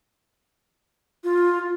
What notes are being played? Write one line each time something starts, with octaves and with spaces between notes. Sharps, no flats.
F4